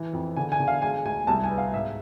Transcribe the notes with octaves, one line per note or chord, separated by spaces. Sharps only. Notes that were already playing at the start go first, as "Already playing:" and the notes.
Already playing: E3
F2
D3 G#5
G#5
D3
F5
G#3 G#5
D2 G#5
C2 A5
G#5
B3
F5
G#2 E5